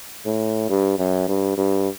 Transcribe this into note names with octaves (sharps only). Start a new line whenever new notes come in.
A2
G2
F#2
G2
G2